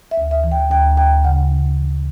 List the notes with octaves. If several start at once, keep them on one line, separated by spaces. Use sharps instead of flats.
E5
D2
E5
E3
G5
D2 G5
D2 G5
C#3 F#5
C#3
E3